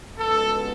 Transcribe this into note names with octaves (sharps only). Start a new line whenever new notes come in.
C#2 B2 G#3 B3 A4